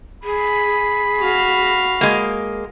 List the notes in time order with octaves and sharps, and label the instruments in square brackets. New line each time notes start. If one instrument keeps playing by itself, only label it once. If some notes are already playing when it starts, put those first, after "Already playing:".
[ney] G#4 [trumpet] B5
[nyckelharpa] F#4 F5
[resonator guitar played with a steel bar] G#3 A#3